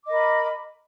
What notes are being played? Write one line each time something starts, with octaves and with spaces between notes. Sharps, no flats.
A#4 D#5 B5 D6